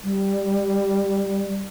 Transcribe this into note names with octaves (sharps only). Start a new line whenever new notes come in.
G3